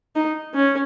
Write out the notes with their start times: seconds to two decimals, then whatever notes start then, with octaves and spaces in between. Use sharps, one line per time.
0.16 D#4
0.54 C#4